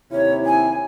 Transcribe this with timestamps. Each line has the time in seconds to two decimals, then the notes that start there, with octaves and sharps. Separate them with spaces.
0.12 D#2 C3 E4 C#5
0.46 G#5